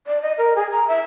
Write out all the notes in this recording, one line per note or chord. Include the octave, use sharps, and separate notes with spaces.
D5
D#5
A#4
G#4
A#5
E5